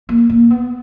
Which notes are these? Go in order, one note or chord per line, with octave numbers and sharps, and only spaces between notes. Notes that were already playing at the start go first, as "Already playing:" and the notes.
A#3
A#3
B3